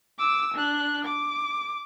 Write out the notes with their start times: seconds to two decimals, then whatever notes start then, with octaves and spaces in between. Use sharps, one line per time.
0.19 D6 E6
0.54 D4 F#6
1.05 D6